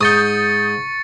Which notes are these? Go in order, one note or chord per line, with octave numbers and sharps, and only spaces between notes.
G#2 C#6 D#6 G6 A6 C#7